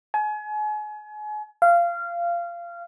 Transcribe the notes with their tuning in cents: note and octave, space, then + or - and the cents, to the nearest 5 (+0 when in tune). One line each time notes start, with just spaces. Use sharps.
G#5 +35
F5 -20